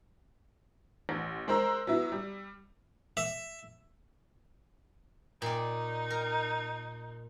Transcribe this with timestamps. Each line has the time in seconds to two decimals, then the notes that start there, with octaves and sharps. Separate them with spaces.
1.09 A1
1.48 G#3 A#4 C5 A#5 E6
1.87 F#3 B3 E4
2.12 G3
3.17 E5
5.42 A#2 D#4 D5
6.10 A#4